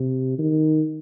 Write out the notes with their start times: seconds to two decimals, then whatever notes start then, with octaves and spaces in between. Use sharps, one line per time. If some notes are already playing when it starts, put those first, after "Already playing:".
Already playing: C3
0.39 D#3